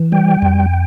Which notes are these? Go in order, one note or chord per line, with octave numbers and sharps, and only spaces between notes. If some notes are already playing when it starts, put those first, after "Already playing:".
Already playing: E3
G3 G5
F2